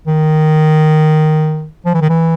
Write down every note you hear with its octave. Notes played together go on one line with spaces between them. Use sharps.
D#3
F3
E3
D#3
E3